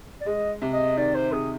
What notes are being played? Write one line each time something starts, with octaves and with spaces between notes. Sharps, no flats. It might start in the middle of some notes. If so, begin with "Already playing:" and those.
D5
G#3 D#5
C3
D#5
D#3 D5
C5
C3 G#4